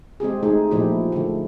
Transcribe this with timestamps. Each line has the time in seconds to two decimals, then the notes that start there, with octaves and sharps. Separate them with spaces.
0.20 G#3 C4 G4 G#4
0.43 G#3 A3 D#4 G#4
0.71 A#2 F3 A3 E4 G4
1.12 D3 A3